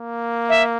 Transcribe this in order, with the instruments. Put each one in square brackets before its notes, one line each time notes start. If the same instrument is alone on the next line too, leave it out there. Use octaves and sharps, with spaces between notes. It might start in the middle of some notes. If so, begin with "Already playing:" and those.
Already playing: [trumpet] A#3
[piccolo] E5